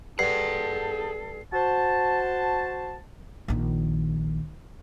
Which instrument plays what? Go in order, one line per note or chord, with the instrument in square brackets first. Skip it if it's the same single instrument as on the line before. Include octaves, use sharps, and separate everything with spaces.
[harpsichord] G2 [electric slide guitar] G#4 F#5 [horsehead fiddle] A4 [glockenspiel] C7
[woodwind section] F#4 C5 A5
[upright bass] A#1 D#3